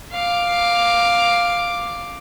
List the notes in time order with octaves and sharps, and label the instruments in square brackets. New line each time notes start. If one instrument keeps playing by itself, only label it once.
[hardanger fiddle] F5 D6